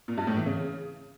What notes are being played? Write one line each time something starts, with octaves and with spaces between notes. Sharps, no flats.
A#2
G2
A2
E3
C#3